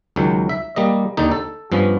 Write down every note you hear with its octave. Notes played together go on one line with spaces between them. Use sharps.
C#2 D#3 F#3
E5
G3 A#3 D#5
D#2 D3 D#3 D#4
A4
G2 F3 B3 C#4